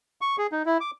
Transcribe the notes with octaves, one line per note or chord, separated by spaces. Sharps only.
C#6
G#4
D#4
E4
D6